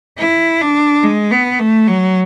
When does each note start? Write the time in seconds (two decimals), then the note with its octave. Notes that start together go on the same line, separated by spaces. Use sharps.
0.19 E4
0.61 D4
1.04 G#3
1.31 B3
1.59 A3
1.88 F#3